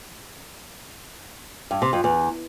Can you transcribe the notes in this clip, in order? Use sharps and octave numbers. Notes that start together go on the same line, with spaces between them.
G2
C3
F2
E2